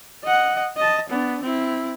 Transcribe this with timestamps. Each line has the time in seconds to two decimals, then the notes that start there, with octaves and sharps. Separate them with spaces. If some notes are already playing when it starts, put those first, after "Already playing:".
0.23 D#5 F#5
0.77 D#5 A5
1.09 B3 D4
1.43 C4 E4